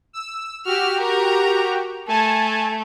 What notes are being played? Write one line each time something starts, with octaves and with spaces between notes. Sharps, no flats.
E6
F#4 G4 E6 F6
A#4 A#5
A3 G#5 A5